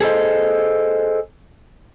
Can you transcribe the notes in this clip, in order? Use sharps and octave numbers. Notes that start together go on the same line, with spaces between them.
G#4 A4 C5 D#5